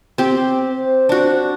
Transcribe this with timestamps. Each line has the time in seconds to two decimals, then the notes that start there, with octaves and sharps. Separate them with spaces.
0.18 C4 G4
0.72 C5
1.09 D4 F#4